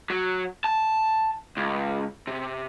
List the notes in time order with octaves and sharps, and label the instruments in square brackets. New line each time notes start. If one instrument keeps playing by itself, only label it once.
[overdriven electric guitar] F#3
A5
C#2
C3